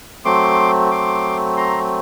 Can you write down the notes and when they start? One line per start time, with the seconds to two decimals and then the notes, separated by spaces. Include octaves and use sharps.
0.25 F#3 A3 C4 C6 D6
0.91 C6 D6
1.57 A#5 C6